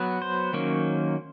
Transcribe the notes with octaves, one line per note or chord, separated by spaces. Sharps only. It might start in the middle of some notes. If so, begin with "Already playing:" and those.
Already playing: F#3 B3
C5
D#3 F#3 A#3 C#4